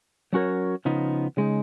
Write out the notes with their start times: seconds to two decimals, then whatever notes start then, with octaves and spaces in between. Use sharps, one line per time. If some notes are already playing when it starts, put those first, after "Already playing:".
0.33 F#3 C#4 F#4 A#4 C#5
0.85 C#3 F3 B3 D#4
1.37 C#3 G#3 D#4